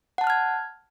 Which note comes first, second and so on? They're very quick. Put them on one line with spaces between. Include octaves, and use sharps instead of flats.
F#5 A5 F#6 F6 G#6